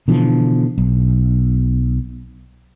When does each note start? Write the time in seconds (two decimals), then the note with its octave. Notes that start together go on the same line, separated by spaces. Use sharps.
0.08 B2 D3 E3 F3
0.78 B1